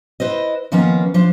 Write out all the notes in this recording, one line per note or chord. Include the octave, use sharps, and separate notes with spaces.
E4 B4 C5 D#5
D#3 F3 A#3 B3 C#4
F3 D4 C5